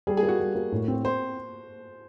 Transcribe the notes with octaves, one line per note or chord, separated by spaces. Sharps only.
G3 G#4
G#4
A#3
F#4
G3
A#3
A2
C4
C4 C5